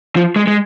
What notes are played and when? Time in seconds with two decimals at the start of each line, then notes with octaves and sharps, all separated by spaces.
0.16 F3
0.36 G#3
0.47 G#3